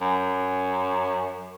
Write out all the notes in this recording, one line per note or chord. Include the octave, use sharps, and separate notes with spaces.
F#2